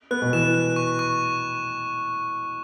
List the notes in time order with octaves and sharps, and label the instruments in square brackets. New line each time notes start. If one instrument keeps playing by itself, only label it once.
[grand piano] B3 [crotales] F#6
[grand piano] B2
[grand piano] E3 [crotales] E7
[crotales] F#6
C#6
C#6